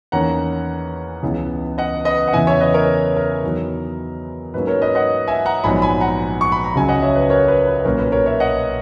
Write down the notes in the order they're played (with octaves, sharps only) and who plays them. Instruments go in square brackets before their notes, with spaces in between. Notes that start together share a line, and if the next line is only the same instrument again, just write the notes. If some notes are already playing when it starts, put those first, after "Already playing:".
[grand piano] E2 D#3 A#3 C#4 F#5 A#5
C#2 C#3 E3 B3
D#5 F#5
B4 D#5
F#5
E2 C#3 E3 B3 E5 G#5
C#5 E5
B4 D#5
A#4 C#5
A#4
E2 D#3 F#3 B3
G#2 F#3 A#3 C#4 B4
A#4 C#5
B4 D#5
D#5 F#5
E5 G#5
F#5 A#5
A#1 G#2 F#3 B3 G#5 B5
G#5 B5
F#5 A#5
C#6
B5
A#5
C#2 C#3 F#3 C#4 G#5
D#5 F#5
C#5 E5
B4
A#4 C#5
B4
B4
B1 A#2 A#3 C#4 A#4 C#5
B4
A#4 C#5
C#5 E5
D#5 F#5